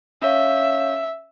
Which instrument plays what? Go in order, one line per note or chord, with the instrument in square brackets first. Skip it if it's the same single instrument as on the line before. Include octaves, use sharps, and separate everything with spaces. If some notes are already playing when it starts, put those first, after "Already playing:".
[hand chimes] C#4 C#5 F5 [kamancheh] E5